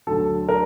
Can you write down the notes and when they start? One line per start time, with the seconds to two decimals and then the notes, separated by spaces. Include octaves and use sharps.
0.07 D2 D3 F#3 A4
0.49 A#4